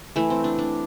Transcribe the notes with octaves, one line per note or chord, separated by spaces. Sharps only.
E3 A3
C4
D4
D4